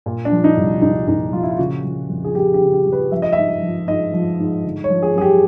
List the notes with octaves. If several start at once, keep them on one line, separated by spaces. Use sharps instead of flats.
A#2
D4
F3
D#4
C2
C2 D#4
A#2 D#4
F3 F4
E4
F4
C#3 F#4
F3
F2
G#4
F2 G4
G4
C#3
G4
F3
B4
F3 E5
D#5
G#2 E5
F3
G#2 D#5
F3
G#2
D3
C#5
F3
G#4
F#2 G#4
G4